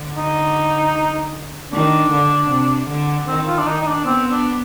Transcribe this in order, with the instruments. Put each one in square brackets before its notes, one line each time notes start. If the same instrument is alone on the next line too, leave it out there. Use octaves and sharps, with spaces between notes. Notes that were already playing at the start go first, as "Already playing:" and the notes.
Already playing: [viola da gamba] D3
[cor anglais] D#4
[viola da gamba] D#3 [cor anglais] D4
[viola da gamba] D3
C3
D3
[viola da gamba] D#3 [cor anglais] C4
[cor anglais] F4
D4
[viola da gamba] D#3 [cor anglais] D#4
[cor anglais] D#4
D4
[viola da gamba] B3 [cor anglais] C4
[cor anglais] D4